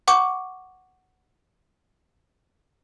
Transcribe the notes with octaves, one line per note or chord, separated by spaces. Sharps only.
F#5 C#6 D6